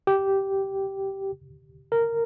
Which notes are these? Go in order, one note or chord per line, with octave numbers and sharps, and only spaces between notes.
G4
A#4